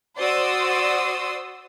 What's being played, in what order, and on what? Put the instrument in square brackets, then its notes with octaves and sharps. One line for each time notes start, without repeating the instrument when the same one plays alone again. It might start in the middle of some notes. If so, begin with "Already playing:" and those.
[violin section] F#4 C5 D5 C6 D#6 E6